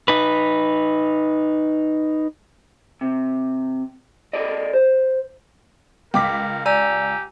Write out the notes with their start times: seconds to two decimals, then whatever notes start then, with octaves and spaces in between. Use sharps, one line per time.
0.08 D#4 B4
3.01 C3
4.33 G#4 A4 D5 D#5
4.73 C5
6.14 C#2 A#4 G5 D6 B6
6.66 G4 D5 G#5 A#5 E6